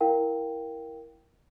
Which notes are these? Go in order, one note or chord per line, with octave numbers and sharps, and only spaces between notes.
E4 A#4 F5 G5